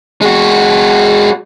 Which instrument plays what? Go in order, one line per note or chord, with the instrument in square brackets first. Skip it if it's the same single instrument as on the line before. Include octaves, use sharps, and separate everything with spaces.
[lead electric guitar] G#3 F#4